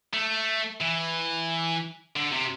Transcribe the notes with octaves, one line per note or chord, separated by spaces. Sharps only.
A3
E3
D3
C3